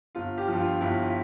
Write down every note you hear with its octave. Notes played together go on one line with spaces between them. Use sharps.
G1 F4
G4
G2 F3
F4
G1 E4